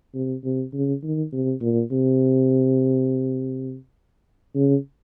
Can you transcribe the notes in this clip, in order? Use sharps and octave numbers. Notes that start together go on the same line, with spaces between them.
C3
C3
C#3
D#3
C3
A#2
C3
C#3